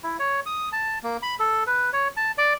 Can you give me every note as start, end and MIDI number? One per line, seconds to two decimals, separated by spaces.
0.03 0.17 64
0.19 0.40 73
0.46 0.69 87
0.72 0.99 81
1.03 1.17 58
1.22 1.35 83
1.40 1.64 69
1.67 1.90 71
1.93 2.08 73
2.17 2.32 81
2.38 2.53 74